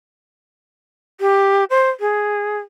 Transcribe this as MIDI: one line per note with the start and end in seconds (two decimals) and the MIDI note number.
1.21 1.64 67
1.70 1.90 72
2.00 2.58 68